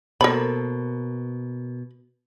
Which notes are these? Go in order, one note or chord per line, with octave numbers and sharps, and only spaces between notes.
B2 A#3 A4 A#4 C5 B5